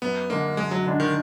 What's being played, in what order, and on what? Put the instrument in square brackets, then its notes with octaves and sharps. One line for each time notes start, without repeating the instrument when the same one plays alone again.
[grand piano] F#2 [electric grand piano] B3
[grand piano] D3 G#3 D4 [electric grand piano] A#3
[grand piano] F#2 [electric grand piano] G#3
[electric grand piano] F#3
[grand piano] D3 G#3 D4
[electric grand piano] D#3